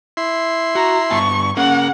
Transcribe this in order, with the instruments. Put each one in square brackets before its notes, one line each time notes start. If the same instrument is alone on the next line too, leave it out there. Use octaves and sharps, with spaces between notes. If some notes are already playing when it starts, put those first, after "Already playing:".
[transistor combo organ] E4 C6
[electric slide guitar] F#4 [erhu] A#5
[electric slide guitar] G2 B3 A5 [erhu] C#6
[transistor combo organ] A#3 [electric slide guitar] C#4 G#4 [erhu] F#5